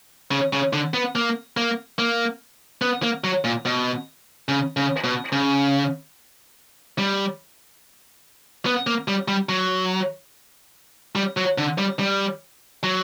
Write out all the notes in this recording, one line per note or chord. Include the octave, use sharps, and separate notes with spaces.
C#3
C#3
D3
B3
A#3
A#3
A#3
B3
A#3
F#3
A#2
B2
C#3
C#3
B2
C#3
G3
B3
A#3
G3
G3
F#3
G3
F#3
D3
G3
G3
F#3